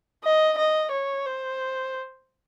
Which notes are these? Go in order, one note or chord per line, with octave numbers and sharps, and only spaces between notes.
D#5
D#5
C#5
C5